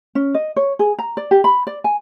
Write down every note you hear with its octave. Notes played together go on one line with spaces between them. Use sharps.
C#4
D#5
C#5
G#4
A#5
D5
G4
B5
D5
G#5